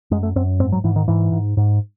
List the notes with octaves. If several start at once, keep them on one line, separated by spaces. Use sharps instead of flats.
F#2 G#3
A3
F#2 C4
G#2 C4
F#3
G#2 E3
D#3
G#2 E3
G#2
G#2